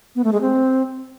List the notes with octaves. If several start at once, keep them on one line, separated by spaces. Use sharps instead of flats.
B3
A3
G#3
C4